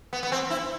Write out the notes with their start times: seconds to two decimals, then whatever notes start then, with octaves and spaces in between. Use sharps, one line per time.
0.13 B3
0.23 B3
0.32 C4
0.50 E4